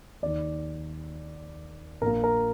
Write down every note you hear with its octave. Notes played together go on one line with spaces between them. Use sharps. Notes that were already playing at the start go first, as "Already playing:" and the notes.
D#2 D#3 D5
A#1 A#4
A#2
A#4